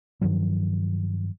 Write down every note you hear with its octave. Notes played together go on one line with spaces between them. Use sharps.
G2 D#3 F3 F#3